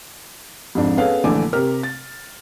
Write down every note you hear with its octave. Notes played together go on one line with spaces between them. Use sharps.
F2 G#2 D4
B3 C#4 G#4 A4 B4 F5
A#1 D3 E3 A3 G#5 D6
C3 G4 A#4 F6
A6